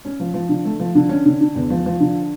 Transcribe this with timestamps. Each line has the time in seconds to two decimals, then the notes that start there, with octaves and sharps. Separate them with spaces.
0.05 C#4
0.20 F3
0.34 F3
0.49 D3
0.65 A3
0.80 F3
0.95 D3
1.09 C#4
1.26 D3
1.41 D3
1.55 E2
1.70 F3
1.86 F3
2.00 D3